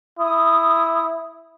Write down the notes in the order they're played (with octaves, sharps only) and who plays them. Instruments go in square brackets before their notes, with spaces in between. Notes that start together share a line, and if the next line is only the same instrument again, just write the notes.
[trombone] E4 [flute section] D#6